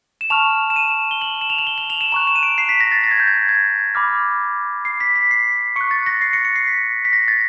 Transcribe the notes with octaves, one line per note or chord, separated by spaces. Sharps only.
E7
A5 C#6 F6 F7
E7
D#7
G7
F#7
E7
F7
F#7
G7
F#7
F7
E7
A#5 C#6 F#6 F7
E7
D#7
D7
C7
B6
A#6
A6
A6
G#6
G6
G#6
G#6
B5 D6 F6
C7
B6
B6
C7
C#6 F#6 C#7
A6
A#6
C7
C#7
C#7
C7
B6
B6
A#6
A6